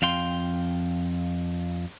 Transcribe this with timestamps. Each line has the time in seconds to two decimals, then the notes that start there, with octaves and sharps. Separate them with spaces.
0.02 F2 F5 G5 C6